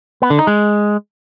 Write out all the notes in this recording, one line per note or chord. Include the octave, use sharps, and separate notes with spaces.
B3
D3
D#4
G#3